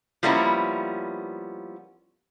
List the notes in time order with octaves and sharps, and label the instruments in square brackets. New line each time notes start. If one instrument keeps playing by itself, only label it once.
[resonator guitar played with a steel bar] F3 G3 A#3 B3 C#4 E4